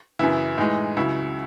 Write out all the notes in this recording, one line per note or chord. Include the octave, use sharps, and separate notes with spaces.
F#2 C#3 E3 E4
A2 E3 G#3 D#4
C#2 C#3 F#3 E4